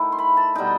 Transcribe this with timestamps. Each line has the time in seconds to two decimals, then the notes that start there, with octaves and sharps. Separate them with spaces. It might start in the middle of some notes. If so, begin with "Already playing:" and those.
Already playing: D#3 A3 E4
0.12 C6
0.19 B5
0.37 A5
0.55 B2 G3 D#4 G5